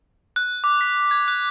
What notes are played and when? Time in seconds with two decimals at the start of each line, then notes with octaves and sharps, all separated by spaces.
0.36 F#6
0.64 D6
0.81 B6
1.11 G#6
1.28 F#6